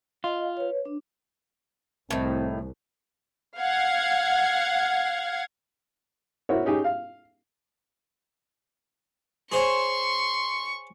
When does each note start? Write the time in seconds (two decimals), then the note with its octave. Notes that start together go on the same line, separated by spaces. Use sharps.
0.24 F4 D#5 F5
0.57 B4 C#5
0.85 D4
2.10 C2 A2 D#3 C4
3.60 F5 F#5 G#6
6.49 E4 F#4 A#4 C5 C#5
6.65 C#4 D#4 G4 G#4
6.84 F5
9.52 G#4 C5 C#5 C6 C#6